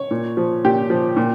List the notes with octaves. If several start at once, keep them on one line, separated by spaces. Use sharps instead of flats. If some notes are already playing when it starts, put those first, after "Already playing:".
Already playing: C#5
A#2
F3
A#2 G4
F3
A#2